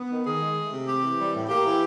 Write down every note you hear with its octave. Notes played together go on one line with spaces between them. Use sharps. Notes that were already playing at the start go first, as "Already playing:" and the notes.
Already playing: B3
D#3
D#3 G#4
G#3
A3
C3
C4 G4
E3
G3
A2
A#3 G4
E3